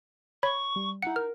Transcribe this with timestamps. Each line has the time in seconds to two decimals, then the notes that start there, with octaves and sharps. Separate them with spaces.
0.43 C#5 B5 C#6
0.76 G3
1.02 D#4 E4 F#5 C#7
1.16 A#4 F6